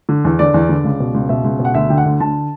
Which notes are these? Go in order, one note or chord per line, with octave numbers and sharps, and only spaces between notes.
D3
E2
D3 D5
E2
D3
C#2
B2
C#2
B2 E5
C#2
B2
F#5
D2 E5
D3 G5
F#5
D2
D3 A5